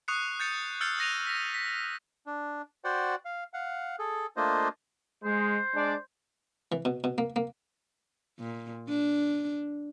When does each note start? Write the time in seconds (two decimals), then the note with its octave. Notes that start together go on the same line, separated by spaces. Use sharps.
0.08 C#6 D#6 F#6 C7 C#7
0.40 G6 A6 C#7
0.81 E6 F6 G6 A6 C7 C#7
0.99 F#6 A#6 D#7 F7
1.27 A#6 B6
1.54 B6
2.26 D4
2.85 F#4 C5 D5 F#5 G5
3.25 F5
3.54 F5 F#5
3.99 G#4 A4
4.37 A3 A#3 D4 F4 C5 D#5
5.24 G#3 C5
5.75 G#3 D4 D5
6.72 E3
6.85 B2
7.04 B2
7.18 A#3
7.36 A#3
8.40 A#2
8.89 D4